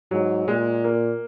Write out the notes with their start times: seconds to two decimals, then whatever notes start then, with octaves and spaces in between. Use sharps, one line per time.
0.11 G#2 F#3
0.48 A#2 G#3
0.84 A#3